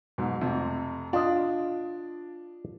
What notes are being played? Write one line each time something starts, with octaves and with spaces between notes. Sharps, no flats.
G#2 B2 F#3
F2 C3 A3
D4 F4 D#5